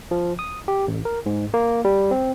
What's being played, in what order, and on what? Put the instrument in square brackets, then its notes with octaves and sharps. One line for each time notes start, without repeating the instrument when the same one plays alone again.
[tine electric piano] F3
D#6
G4
A1
A#4
G#2
A#3
G3
C4